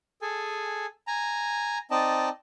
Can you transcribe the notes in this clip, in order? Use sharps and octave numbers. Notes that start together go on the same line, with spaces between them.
G#4 A4 G#5
G#5 A#5
C4 D#4 D5 D#5 A5